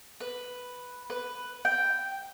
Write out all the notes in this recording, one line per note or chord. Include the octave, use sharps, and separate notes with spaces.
B4
B4
G5